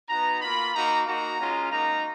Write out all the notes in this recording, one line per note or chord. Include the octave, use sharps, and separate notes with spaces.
B3 D#4 F#4 A#5
A#3 F4 B5
A#3 D#4 F#4 A#5
A#3 D#4 F#4 A#5
G#3 C#4 F4
A#3 D#4 F#4 A#5